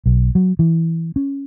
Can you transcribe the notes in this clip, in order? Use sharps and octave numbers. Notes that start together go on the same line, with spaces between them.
B1
F#3
E3
C#4